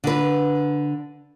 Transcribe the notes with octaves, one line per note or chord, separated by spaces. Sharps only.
D3 B4